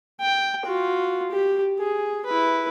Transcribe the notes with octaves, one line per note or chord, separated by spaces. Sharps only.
G5
F4 F#4
G4
G#4
E4 B4